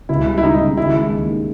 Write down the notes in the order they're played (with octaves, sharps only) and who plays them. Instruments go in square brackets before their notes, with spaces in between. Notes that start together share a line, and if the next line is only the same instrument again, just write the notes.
[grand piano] C#2 [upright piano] E4
[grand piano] G3
[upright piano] E4
[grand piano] C#2 [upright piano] D#4
[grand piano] C#3
[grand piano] D#3 [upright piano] E4
[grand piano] G#3
D#2
D#3